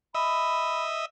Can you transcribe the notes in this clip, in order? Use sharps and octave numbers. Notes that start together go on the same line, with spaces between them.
D#5 E5 B5